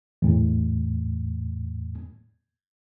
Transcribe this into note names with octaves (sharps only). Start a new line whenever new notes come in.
E2 A2